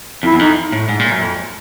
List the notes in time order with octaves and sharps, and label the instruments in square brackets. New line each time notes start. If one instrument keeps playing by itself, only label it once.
[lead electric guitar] F2 [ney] E4
[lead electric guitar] E2
[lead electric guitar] F2 [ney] D#4
[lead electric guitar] A2
G#2
A#2
F#2
F2